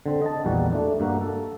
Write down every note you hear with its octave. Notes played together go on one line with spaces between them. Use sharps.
D3 C4
D#5 A5
A#1 E2 G3 A#3 F#4
A3 D4
G2 A#3 F#4
A4